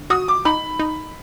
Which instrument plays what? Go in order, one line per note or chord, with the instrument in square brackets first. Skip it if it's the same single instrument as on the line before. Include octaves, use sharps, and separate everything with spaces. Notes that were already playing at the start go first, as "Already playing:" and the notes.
Already playing: [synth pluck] D3
[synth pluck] F#4 [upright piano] D#6
[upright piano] D6
[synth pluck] D#4 [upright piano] B5
[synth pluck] D#4